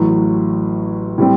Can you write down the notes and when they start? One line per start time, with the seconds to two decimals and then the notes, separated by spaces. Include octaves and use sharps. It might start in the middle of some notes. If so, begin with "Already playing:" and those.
Already playing: A1 A2 F#3
1.18 A2 G3 C4